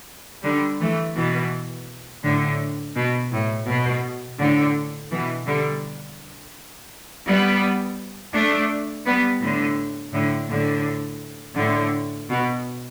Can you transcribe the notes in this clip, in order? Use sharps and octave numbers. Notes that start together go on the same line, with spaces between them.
D3 G3
E3 A3
B2 E3
A2 D3
B2
A2
B2
A2 D3
B2 E3
D3 G3
G3 B3
A3 D4
G3 B3
A2 D3
A2 D3
A2 D3
A2 D3
B2